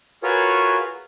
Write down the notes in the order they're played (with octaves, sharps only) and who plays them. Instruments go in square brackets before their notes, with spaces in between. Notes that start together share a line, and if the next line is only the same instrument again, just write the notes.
[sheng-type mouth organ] F4 F#4 G#4 A#4 B4 C#5